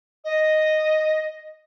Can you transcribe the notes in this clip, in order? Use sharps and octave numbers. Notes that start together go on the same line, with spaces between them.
D#5